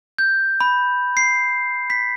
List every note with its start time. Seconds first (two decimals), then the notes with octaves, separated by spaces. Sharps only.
0.18 G6
0.61 B5
1.17 C7
1.90 B6